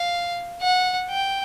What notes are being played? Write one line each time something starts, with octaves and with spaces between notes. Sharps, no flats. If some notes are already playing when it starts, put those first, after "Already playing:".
Already playing: F5
F#5
G5